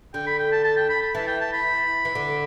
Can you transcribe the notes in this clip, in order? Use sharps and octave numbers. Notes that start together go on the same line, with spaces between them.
D3 G5
B5
G5
A5
A5
G5
B5
B5
E3 A5
G5
A5
B5
E3
D3